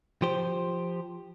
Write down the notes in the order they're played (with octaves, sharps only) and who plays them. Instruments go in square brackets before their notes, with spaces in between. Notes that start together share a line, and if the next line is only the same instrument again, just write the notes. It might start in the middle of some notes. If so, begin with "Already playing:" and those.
[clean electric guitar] F3 G4 C5